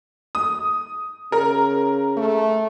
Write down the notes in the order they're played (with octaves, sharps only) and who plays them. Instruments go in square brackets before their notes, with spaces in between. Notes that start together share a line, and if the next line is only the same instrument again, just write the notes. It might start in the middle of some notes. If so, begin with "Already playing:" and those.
[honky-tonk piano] D#6
[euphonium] C#3 [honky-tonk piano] A#4
[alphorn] A3